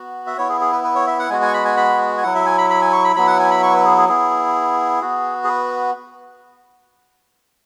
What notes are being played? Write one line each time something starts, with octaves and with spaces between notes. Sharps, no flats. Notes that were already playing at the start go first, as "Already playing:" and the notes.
Already playing: B3 F#4
E5
B3 E4 C#5
G#4
G#4
B4
B4
C#5
E5
F#5
G#3 B3 F#4 G#5
G#5
C#6
B5
G#5
B5
G#5
F#3 E4 F#5
E5
G#5
B5
B5
G#5
C#6
B5
F#3 B3 E4 B5
F#5
G#5
B5
C#6
B4
G#4
G#4
B3 E4 G#4
B3 F#4
G#4
B4